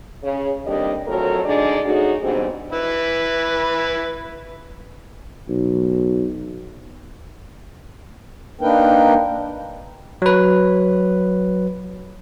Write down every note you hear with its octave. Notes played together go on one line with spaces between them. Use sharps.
C#3
D#2 A2 C3 G3 D4 D#5
F2 A2 F#3 A3 A4 A#4
D3 G#3 D4 D#4 D5
A3 C#4 D#4 F#4 G#4
E2 G#2 D3 G3 B3 C4
E4 B4
B1
A#3 D4 D#4 A#4 B4 G5
F#3 B4